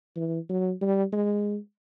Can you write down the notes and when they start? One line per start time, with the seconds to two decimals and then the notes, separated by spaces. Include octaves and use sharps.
0.16 E3
0.49 F#3
0.81 G3
1.12 G#3